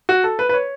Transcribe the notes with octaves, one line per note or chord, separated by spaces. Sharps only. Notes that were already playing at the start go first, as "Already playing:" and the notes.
F#4
A4
B4
B4
C#5